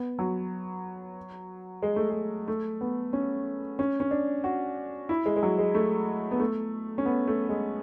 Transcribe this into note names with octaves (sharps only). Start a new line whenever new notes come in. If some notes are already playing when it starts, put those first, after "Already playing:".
Already playing: B3
F#3
G#3
A3
G#3
A3
B3
C#4
C#4
C#4
D4
F#4
E4
G#3
G#3
F#3
G#3
A3
B3
A3
C#4
B3
A3
G#3